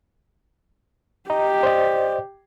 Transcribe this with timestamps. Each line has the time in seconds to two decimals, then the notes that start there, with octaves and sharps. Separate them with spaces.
1.30 G4 D#5 A#5
1.63 C5 D5 D#5